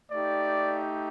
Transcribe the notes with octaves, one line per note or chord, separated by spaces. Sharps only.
A3 D#4 G4 D5